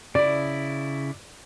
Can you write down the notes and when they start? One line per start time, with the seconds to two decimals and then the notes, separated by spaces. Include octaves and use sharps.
0.15 C#3 E4 D5